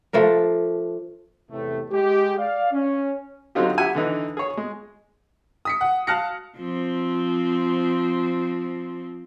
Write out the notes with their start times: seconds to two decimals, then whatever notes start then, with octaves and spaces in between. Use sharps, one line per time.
0.13 F3 A3 D4 A#4
1.51 E2 A2 C3 A3
1.91 G#3 G4
2.38 D5 F5
2.72 C#4
3.55 D3 F#3 C4 D#4 F4 G4
3.78 G4 E5 F#5 G#5
3.95 D3 E3 D#4
4.37 G#4 C#5
4.57 G#3
5.65 D#6 B6 C#7
5.81 F#5
6.07 F5 A5 F6 F#6 A#6 C#7
6.57 F3 C4